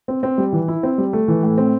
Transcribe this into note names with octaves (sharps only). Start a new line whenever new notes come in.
C4
C4
G3
E3
E4
C4
G3
A3
E3
A2
C4